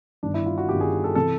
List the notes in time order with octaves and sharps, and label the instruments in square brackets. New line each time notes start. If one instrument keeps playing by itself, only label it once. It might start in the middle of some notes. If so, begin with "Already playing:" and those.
[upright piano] G1 G2 D#3 D4
E4
F4
F#4
G1 G2 D#3 G4
G#4
A4
C3 E3 A4